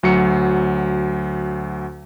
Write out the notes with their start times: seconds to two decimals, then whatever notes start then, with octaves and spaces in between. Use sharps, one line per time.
0.03 D2 F#3 C#7